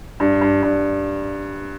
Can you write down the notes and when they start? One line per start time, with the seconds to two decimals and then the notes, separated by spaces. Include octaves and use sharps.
0.20 G2
0.41 G2
0.63 G2